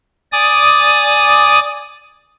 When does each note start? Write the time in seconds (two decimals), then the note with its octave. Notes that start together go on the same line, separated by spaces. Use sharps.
0.32 D5 G#5 D6 D#6